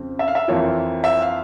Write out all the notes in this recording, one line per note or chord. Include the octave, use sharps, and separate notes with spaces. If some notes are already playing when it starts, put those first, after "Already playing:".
Already playing: F2 C#3 C4
E5
F5
E5
F2 E3 A#3 F4 C#5
E5
F5